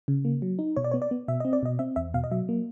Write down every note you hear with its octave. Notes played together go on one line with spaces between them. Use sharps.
C#3
A#3
F#3
D#4
B2 C#5
D5
B3 C#5
D5
B3
B2 E5
C4 D#5
D5
B2 D#5
C4 E5
E2 E5
B2 F5
D#5
F#3 E5
A#3